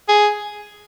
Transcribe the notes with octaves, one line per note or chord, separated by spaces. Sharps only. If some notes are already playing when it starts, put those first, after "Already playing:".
G#4